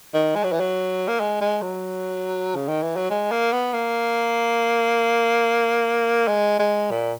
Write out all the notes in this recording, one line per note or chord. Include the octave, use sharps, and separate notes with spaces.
D#3
G#3
F#3
E3
F#3
A#3
G#3
G#3
F#3
C#3
D#3
E3
F#3
G#3
A#3
B3
A#3
G#3
G#3
A#2